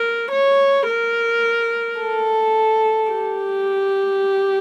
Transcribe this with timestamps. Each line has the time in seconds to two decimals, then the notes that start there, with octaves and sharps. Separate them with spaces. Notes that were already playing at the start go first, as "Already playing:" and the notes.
Already playing: A#4
0.31 C#5
0.88 A#4
2.00 A4
3.11 G4